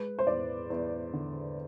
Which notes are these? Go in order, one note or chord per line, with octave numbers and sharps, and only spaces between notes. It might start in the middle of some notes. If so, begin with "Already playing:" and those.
Already playing: G#3 B4
C5
E2 D5
E2
D3